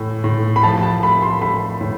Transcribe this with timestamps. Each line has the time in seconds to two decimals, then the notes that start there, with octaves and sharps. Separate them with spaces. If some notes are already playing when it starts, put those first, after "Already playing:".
Already playing: A2 E3 A3
0.24 A2
0.56 B5
0.63 F3 A5
0.83 A5
1.02 A3 B5
1.22 C6
1.41 A3 B5
1.81 A2